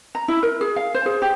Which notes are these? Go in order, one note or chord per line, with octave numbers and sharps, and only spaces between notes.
A#5
E4
A#4
G#4
F5
C5
G#4
G4